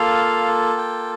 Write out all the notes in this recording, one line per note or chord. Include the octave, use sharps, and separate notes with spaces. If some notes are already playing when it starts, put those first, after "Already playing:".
Already playing: A#3 F4 A4 F5
G5